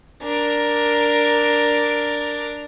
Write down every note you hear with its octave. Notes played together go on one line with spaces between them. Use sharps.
D4 A#4